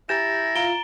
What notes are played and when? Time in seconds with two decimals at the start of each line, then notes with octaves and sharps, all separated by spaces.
0.09 E4 G4 G#5 A#5 G6 A6 A#6 E7
0.56 F4 F5 A#5 D7 G7